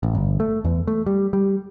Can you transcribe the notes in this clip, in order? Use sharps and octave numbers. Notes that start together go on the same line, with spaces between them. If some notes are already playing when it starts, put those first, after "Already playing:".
A1
G1
A3
E2
A3
G3
G3